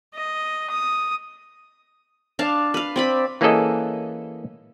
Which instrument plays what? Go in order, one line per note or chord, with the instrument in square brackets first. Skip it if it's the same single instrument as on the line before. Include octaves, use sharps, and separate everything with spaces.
[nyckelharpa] D#5
D#6
[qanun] D4 F5 A5
B4 F5
C4 D5 B5
[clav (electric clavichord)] E3 A#3 C#4 G#4 A4 D#5